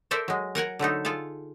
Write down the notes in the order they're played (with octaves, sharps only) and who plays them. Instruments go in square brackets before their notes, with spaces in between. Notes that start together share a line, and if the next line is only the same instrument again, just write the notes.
[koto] A4 A#4 C5 D5 E5
F#3 G#3
A#4 F#5 G#5 A#5
D3 F#3 A3 D#4
F4 G#4 A4 F5